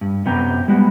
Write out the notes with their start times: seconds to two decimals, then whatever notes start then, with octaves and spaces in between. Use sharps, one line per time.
0.01 G2
0.25 F#2 C3 F#3 B3 G5 A#5
0.68 G3 G#3 B3 F#4